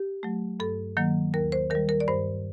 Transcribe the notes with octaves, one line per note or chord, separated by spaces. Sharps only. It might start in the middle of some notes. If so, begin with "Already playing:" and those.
Already playing: G4
F#3 A3
G2 A4
D#3 F#3 A#3
D#2 A#4
C5
D#3 G3 A#4
A#4
D5
G2 C5